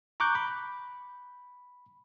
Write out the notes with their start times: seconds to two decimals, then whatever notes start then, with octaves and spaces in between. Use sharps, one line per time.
0.20 A#5 C#6 D6 F#6 G6
0.35 B5